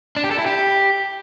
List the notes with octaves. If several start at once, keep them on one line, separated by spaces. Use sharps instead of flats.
D4
G4
A4
E4
G4